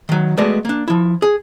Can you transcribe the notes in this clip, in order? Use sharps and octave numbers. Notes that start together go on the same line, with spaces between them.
D#3 F#3
G#3 A3 B3 F#4 D5 D#5
A#3 D4
F3 E4
G#4